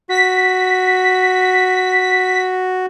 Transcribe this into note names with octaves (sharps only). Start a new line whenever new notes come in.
F#4 B6